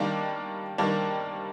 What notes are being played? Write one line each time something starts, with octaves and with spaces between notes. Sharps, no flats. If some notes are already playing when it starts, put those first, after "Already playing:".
Already playing: D#3 G3 A#3 D4
D#3 G3 A#3 D4